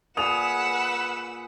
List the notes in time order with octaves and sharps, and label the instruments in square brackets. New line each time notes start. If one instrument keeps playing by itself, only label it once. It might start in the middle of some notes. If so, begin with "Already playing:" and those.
[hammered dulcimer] A#2 G#4 [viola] B4 F#5 [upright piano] D#6 F7 [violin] E6 E7